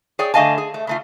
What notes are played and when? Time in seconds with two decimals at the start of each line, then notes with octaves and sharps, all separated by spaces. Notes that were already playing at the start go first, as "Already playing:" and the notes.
0.19 G#4 C#5 D5 G5
0.34 D3 A3 D#5 F5 G#5 A5
0.58 G#4
0.74 A3
0.87 C#3 A3 F4